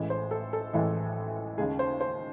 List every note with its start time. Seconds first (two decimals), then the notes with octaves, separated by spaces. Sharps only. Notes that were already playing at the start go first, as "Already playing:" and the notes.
Already playing: A1 A2 E3 G#3
0.10 C5
0.31 A4
0.53 A4
0.73 A1 A2 E3 G#3
1.57 D#2 C#3 G#3 G#4
1.79 C5
2.01 C5